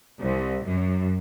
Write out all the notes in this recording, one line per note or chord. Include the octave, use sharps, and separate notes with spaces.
C2
F#2